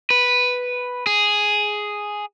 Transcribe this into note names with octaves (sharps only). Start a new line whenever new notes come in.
B4
G#4